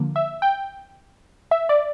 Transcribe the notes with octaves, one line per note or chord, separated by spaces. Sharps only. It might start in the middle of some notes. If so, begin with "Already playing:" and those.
Already playing: D3 F3 A#3
E5
G5
E5
D5